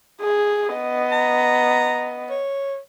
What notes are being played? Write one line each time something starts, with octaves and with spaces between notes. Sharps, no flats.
G#4
B3 D#5
A#5
C#5